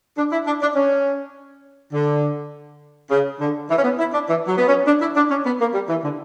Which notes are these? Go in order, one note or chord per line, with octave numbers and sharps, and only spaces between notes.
D4
E4
D4
D4
C#4
D3
C#3
D3
E3
C#4
B3
E4
D4
E3
F#3
B3
C#4
D4
E4
D4
C#4
B3
A#3
G3
E3
D3